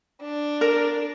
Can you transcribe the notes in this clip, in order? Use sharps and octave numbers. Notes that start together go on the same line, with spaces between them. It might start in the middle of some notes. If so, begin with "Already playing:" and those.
D4
A#4